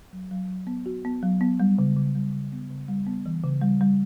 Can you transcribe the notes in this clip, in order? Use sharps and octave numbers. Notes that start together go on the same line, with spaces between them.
F#3
F#3
F#3
B3
F#4
B3
F#3
B3
G3
C#3
C#3
G3
C#3
B3
C#3
G3
B3
E3
C#3
G3
G3